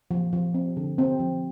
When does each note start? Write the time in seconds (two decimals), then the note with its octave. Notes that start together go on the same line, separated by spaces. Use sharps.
0.11 F3
0.33 F3
0.54 C4
0.77 D3
0.98 C4
1.19 F3